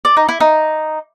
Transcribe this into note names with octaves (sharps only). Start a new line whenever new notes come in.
D5
D#4
E4
D#4